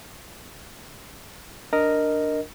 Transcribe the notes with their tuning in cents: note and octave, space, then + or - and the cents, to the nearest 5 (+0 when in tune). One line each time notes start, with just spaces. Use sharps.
D4 +0 A#4 +0 D#5 +0